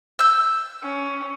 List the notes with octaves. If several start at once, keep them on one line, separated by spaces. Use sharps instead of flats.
E6 G6
C#4